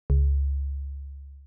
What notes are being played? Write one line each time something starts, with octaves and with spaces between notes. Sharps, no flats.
C#2